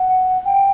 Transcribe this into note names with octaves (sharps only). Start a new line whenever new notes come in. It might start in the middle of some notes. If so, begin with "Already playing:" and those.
Already playing: F#5
G5